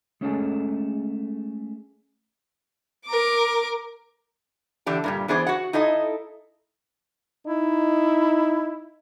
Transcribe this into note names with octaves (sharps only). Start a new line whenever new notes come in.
G#3 A3 C#4 G#4 A4
A#4 D6
D3 E3 D4 G4
G2 A#2 G3
E3 B3 D4 G#4 C5 D5
F#4 F#5
D#4 E4 A4 D#5
D#4 E4